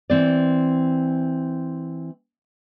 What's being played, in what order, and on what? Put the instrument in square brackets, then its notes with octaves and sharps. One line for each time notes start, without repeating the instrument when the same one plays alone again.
[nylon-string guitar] E3 C4 D5